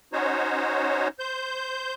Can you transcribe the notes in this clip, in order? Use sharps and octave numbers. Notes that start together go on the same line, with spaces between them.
C#4 D#4 F#4 C5 C#5
C5 G6